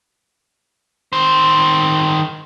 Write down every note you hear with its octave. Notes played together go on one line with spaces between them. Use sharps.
D#3 C5